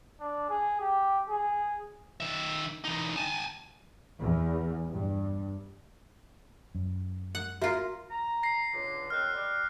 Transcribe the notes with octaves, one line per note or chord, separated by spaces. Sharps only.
D4
G#4
G4
G#4
D#3 E5
E3 D#4
G#5 A5
E2
G2
F#2
F#5
A#3 F4 F#4 E5
A#5
A#6 C7
C#2 D3
D#3 F#3 C4 F6 F#6
G3